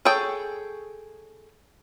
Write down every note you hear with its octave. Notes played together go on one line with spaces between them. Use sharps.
G#4 A4 C#5 G5